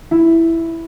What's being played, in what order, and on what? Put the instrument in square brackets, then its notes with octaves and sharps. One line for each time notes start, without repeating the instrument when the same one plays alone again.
[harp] E4